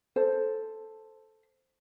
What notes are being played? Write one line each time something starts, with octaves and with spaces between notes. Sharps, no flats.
A4 C5